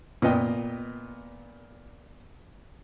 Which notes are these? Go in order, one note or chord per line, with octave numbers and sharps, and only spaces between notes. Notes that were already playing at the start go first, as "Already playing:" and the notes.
A#2 B3 D#5 G5